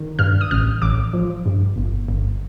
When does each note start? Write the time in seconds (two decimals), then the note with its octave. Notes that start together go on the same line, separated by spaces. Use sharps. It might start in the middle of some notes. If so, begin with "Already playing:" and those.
Already playing: D#3
0.19 G2 F6
0.41 D#6
0.51 A1 F6
0.82 A1 D6
1.13 F3
1.46 G2
1.76 G1
2.08 G1